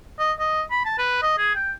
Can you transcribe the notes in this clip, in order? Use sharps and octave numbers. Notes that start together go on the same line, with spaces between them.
D#5
D#5
B5
A5
B4
D#5
G#4
G5